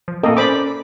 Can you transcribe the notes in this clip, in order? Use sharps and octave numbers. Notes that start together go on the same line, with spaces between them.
F3
A2 A#3 C4 A4 A#4 D#5
C#4 C5 D5 B5 D6